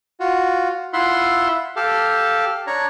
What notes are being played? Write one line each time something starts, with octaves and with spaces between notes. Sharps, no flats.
F4 F#4
E4 F4 E5 F#5 C6
G4 A4 F5
D4 C#5 A#5